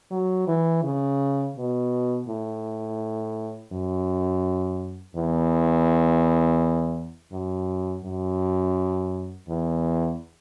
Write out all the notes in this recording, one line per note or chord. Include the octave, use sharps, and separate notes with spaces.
F#3
E3
C#3
B2
A2
F#2
E2
F#2
F#2
E2